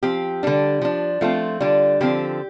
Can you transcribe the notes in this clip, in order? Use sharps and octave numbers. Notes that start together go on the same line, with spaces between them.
F3 C4 G4
D3 G3 D4
F3 D4
F3 A3 C4 F4
D3 G3 D4
D3 F3 C4 G4